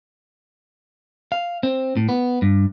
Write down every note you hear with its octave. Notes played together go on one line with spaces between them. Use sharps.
F5
C4
A2
B3
G2